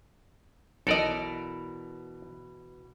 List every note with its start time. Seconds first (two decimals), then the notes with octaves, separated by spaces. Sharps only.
0.87 B1 B2 E3 A4 A#4 D5 D#5